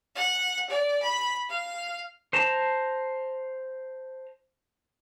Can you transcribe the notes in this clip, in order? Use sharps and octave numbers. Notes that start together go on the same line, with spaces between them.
F#5
D5
B5
F5
C5 A5 A#5